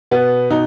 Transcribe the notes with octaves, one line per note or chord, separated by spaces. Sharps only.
B2 B3
B2 D#4